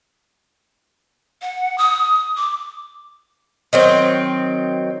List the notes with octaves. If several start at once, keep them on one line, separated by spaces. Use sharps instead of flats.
F#5
D#6
D6
D#3 F#3 C4